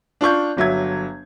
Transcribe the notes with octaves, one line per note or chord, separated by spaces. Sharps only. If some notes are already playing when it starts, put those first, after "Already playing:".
D4 F4 C#6 G6
G1 F#3 E5 G#6